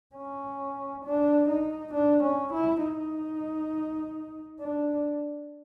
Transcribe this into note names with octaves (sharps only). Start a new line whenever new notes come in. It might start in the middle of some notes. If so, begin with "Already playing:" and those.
C#4
D4
D#4
D4
C#4
E4
D#4
D4